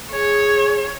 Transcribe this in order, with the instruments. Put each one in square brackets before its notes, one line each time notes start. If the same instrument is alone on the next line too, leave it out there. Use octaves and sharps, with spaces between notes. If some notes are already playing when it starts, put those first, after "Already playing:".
[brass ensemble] G#4 [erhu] C#5